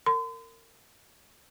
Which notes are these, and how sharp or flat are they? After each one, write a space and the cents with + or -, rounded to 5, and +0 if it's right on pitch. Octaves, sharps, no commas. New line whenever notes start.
A#4 -30 C6 -45